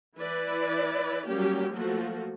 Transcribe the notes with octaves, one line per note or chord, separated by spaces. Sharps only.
E3 E4 B4 D5
F#3 G3 A#3 C#4 G4
F3 F#3 A3 A#3 F4 F#4